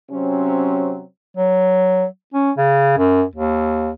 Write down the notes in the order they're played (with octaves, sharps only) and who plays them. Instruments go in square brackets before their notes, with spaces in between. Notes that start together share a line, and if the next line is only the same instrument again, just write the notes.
[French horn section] C3 F#3 C4 C#4
[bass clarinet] F#3
C#4
C#3
F#2
D#2